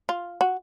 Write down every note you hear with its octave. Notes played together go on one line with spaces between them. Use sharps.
F4
F#4